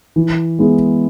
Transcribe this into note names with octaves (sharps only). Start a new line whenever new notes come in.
E3
G#3 B3 E4 G#4